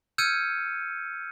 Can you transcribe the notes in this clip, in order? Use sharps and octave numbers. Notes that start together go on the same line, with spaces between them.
E6 F6 G6 G#6 C#7 D#7